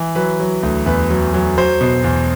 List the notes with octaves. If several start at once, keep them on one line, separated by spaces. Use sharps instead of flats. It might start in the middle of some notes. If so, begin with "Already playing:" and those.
Already playing: E3
F#3 B4
F#3
D2
E2 B4
F#3
F#3
F#3 C5
B2
E2